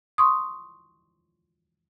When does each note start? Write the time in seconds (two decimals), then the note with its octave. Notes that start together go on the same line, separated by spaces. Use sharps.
0.18 C6 C#6 D#6